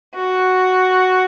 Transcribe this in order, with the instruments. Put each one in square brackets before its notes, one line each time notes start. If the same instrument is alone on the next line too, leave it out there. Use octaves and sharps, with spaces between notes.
[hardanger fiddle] F#4